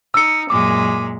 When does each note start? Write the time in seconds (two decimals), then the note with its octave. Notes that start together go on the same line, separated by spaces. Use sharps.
0.14 D#4 E6 C#7
0.50 F#2 A#2 G#3 D6